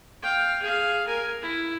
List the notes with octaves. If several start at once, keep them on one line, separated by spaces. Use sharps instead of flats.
F5 G5
G#4 F5
A#4 G#5
E4